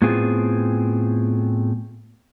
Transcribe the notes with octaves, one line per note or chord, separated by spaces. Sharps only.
A2 B3 C4 F4 G#4